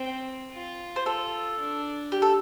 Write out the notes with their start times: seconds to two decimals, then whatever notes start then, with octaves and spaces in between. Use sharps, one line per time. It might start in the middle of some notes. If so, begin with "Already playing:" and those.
Already playing: C4
0.53 F4
0.96 C5
1.06 F4 A4
1.59 D4
2.12 G4
2.22 A4